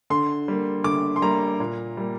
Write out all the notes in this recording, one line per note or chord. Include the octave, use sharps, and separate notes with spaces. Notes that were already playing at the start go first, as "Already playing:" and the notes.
D3 C6
G3 A#3
D3 D6
C6
G3 A#3 A#5
A#2
G3 A#3